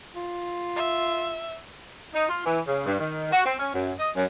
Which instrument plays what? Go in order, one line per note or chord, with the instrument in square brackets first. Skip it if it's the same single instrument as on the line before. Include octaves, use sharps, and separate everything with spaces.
[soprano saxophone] F4
[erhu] E5
[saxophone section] D#4
F4
E3
C#3
G2
D#3
F#4
C4
C#4
F#2
D#5
F#2